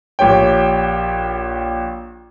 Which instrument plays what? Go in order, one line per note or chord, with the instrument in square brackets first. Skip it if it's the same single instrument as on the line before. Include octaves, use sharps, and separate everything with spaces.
[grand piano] A#1 G4 C#5 G5